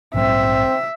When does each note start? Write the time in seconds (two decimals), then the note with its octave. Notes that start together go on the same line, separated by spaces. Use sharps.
0.14 A#1 G#2 F#3 C4 E5